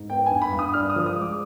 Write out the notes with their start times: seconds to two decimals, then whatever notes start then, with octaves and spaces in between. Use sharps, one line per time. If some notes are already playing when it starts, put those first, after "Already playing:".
Already playing: G#2
0.10 B3 G5
0.26 G2 G#5
0.42 B5
0.52 G2
0.59 D#6
0.74 D4 F6
0.90 D#6
0.96 F3
1.06 D#6
1.17 G#3
1.22 D6